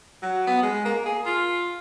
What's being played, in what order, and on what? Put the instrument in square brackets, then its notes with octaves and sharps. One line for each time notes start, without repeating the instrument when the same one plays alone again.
[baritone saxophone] F#3
B3
G#3
A#3
G#4
F4